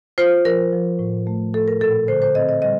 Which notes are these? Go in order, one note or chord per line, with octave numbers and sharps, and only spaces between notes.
F4 C5
F3 A#4
F3
A2
A3
A3 A4
A#4
A#2 A4
D3 C5
C5
C4 D#5
D#5
G3 D#5